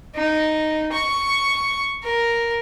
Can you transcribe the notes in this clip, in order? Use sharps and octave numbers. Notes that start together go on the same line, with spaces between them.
D#4
C#6
A#4